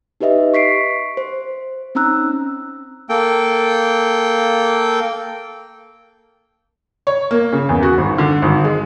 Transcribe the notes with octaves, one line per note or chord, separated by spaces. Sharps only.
D#4 G4 B4 D#5 E5
C#6 B6 C7 D7
C5
C4 C#4 D#4 A#5 E6 F#6
A#3 A4 G5
C#5
A#3
C#3
E2
F#4
G#1
D3
G#1
G#3